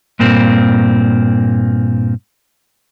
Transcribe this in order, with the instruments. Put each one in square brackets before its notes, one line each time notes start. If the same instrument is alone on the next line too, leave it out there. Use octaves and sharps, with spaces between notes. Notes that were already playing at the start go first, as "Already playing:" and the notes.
[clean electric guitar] G2 A#2 A#3 C4